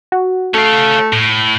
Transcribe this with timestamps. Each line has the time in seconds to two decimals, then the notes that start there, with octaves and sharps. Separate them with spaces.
0.12 F#4
0.54 A3 C#4 F5
1.13 A2